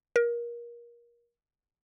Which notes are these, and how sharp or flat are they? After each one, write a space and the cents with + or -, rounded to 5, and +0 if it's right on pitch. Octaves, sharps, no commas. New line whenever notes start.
A#4 +25